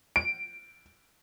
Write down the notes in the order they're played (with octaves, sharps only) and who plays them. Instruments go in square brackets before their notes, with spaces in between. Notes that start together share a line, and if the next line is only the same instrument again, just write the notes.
[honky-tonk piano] D7